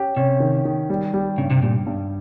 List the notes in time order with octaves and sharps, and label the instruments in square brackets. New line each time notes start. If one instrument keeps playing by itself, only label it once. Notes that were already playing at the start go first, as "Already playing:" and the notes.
Already playing: [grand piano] C#4 G4
[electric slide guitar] C3 [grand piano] C#4
[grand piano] D#3
D#3
G3
G3
[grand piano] G2 [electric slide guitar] C#3
[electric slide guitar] C3
[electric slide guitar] A#2 [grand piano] G3
[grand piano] G2